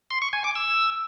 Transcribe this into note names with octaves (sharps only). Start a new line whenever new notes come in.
C6
C#6
G#5
D6
E6